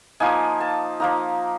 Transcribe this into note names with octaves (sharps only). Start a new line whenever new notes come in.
F3 A#3 D#4 G#5
A5
F3 A#3 D#4 A#5